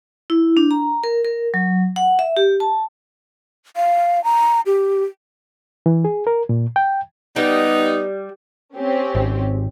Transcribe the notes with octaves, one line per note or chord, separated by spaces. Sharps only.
E4
D4
A#5
A#4
A#4
F#3
F#5
E5
G4
A5
F5
A#5
G4
E3
G#4
A#4
A#2
G5
G3 B3 D#4
C4 C#4 G4
G#1